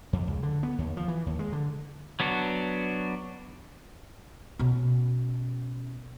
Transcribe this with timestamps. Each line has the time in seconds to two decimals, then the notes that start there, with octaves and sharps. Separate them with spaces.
0.13 F2
0.27 C#2
0.43 D3
0.63 B3
0.78 D#2
0.97 F3
1.08 E3
1.26 D#2
1.39 G#3
1.53 D3
2.20 F#3 B3 D4 F#4
4.59 B2 C#4